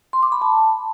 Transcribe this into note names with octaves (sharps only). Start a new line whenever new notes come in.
C6
D6
B5
A5